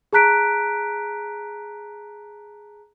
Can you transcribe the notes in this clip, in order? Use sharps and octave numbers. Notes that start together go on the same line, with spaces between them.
G#4 A5 A#5 F#6 B6 D7